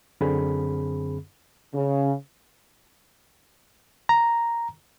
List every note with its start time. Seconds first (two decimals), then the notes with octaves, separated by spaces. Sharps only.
0.21 F#2 D3 C4 G#4 B5
1.74 C#3
4.09 A#5